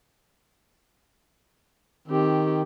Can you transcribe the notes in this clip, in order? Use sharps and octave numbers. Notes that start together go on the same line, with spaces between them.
D#3 C4 G4